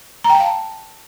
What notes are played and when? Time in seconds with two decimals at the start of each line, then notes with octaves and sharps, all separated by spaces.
0.24 A#5
0.30 G5
0.35 A5
0.40 F5